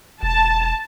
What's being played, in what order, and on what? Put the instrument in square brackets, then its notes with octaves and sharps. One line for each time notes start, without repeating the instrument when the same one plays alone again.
[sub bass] E1 [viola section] A5